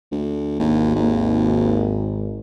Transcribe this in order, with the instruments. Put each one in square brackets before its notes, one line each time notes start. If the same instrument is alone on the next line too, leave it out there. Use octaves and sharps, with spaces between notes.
[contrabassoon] D2
[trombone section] G#1 [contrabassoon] D#2
[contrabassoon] D#2